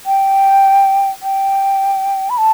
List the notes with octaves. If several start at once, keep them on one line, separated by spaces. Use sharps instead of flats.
G5
G5
B5
A5